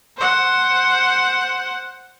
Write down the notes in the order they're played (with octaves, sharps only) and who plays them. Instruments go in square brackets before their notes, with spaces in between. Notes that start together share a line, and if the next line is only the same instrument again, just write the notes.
[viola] C5 F#5